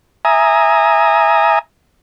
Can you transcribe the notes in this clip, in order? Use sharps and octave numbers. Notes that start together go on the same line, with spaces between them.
E5 G#5 A#5 D#6